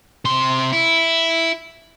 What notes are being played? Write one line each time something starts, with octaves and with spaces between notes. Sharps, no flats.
C3 C6
E4